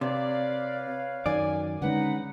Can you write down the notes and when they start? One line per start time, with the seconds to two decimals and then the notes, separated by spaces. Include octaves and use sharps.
0.01 C3 B4 C#5 D5 F5
1.26 F#2 D#3 D5 G#5
1.82 D3 G#3 C#4 D#4 B4 F#5